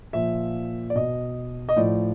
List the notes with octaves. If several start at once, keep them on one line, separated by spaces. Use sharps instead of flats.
A#2 F3 E5
D5
B2 D#5
D#5
A2 F3 D5